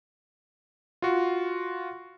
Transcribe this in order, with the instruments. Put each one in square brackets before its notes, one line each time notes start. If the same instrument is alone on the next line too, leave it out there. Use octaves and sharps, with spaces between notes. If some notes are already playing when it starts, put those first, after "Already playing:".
[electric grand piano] F4 F#4